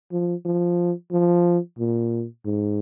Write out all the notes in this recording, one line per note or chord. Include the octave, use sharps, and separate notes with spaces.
F3
F3
F3
A#2
G#2